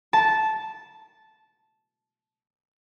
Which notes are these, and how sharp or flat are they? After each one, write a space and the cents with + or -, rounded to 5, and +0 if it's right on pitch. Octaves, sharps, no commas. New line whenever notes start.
A5 -10